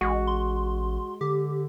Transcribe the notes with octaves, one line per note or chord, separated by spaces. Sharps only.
A1 G#3 F#4
C6
D3 G4